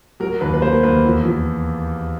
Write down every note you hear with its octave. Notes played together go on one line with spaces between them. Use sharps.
F#3 A#4
D#2 B4
B4
A#3 C5
D#2 B4
E2
E2